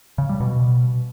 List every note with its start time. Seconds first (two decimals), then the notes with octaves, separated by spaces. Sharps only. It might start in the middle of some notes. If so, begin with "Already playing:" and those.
0.18 C#3
0.29 G3
0.40 B2